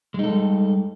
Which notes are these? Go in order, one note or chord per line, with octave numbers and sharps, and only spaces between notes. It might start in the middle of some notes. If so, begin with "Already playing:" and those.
G3 G#3 D#4 A4